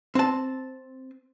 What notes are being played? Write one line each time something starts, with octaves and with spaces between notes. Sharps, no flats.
C4 A5